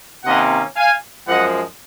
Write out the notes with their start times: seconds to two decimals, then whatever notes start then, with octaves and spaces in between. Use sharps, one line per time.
0.24 C3 D#3 A#3 C#4 D#5 F#5
0.76 F5 G#5
1.26 F#2 F3 G#3 D#5 F#5